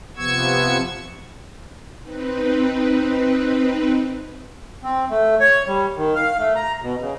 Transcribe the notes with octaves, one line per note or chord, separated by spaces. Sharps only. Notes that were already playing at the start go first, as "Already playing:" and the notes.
C3 F3 B3 C#6 E6 G#6
C4 D#4 B4
C4
A3
C#5
G3
D#3
F5
A3
A#5
B2
C#3